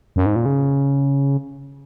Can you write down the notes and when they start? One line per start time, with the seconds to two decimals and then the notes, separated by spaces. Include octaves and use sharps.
0.16 F#2
0.26 G#2
0.36 A#2
0.46 C#3